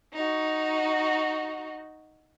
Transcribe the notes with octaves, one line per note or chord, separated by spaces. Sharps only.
D#4 F#4